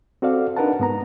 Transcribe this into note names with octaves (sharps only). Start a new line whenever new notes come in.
C4 F#4 A4 D5 F5
D4 D#4 A#4 B4 F#5 A5
G#2 B3 A#5